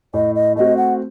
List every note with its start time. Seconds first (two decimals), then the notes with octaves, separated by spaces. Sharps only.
0.14 A2 D#5
0.35 D#5
0.56 A3 C4 F#4 D#5
0.77 F#5